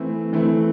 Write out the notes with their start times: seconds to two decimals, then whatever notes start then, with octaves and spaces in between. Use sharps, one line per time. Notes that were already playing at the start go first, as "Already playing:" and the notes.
Already playing: E3 A3 C4
0.33 E3 A3 C4